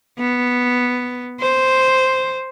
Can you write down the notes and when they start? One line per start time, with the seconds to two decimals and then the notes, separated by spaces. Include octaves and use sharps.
0.18 B3
1.41 C5